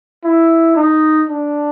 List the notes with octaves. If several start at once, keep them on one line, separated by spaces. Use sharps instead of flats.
E4
D#4
D4